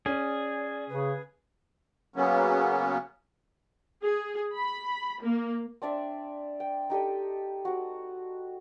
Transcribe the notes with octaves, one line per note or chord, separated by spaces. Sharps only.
C#4 G#4 D5
C#3 B4
C#3 F#3 A#3 B3 C#4
G#4
B5
A#3
C4 D4 D5 E5
G5
D#4 G4 A4 D#5
C4 F#4